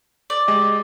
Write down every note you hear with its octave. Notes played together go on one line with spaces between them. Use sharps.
D5
G#3 G4 D#5